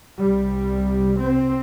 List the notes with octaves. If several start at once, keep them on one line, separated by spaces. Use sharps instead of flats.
C2 C3 G3
C4